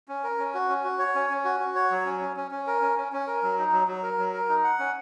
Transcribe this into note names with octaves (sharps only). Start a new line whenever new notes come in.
C#4
A#4
C#4
F#4
C#4
F#4
C#5
C#4
C#4
F#4
F#4
C#5
F#3
C#4
C#4
C#4
C#4
A#4
C#4
C#4
C#4
A#4
F#3
D#4
F#3
F#3
A#4
F#3
A#4
D#4
F#5
C#4